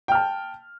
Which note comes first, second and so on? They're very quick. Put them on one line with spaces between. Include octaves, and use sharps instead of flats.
G5 F6 A5